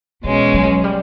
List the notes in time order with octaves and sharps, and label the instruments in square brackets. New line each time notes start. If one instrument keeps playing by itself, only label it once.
[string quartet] B2 G#3 C#4 [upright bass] E3
[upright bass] F#3
G3